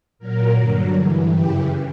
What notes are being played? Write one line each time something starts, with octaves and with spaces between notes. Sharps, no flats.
A#2 F#3 A#4
G2 D3 F#3
G2 E3
F#2 C#3 E3 G4